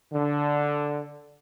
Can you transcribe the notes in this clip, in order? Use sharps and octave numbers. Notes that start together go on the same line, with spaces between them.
D3